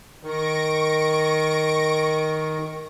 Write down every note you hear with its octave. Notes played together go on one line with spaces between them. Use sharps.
D#3 C#6 A#6 D7